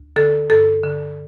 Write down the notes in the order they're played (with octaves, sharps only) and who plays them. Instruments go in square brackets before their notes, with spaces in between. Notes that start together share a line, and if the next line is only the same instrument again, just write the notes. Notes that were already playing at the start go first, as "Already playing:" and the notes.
Already playing: [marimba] D2
D3 A4
G2 A4
D3